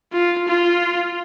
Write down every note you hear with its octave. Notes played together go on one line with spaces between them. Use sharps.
F4
F4